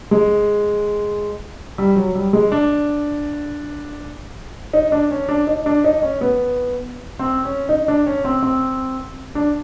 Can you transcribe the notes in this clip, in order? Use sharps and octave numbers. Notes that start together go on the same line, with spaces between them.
G#3
G3
F#3
G3
G#3
D4
D#4
D4
C#4
D4
D#4
D4
D#4
C#4
B3
C4
C#4
D#4
D4
C#4
C4
C4
D4